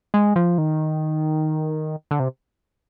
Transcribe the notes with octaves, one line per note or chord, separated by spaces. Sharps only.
G#3
F3
D#3
D3
C3